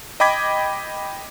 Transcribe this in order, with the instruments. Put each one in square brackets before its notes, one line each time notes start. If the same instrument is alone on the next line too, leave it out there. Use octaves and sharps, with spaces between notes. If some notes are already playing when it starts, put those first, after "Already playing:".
[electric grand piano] D#5 G5 B5 D6 G#6 B6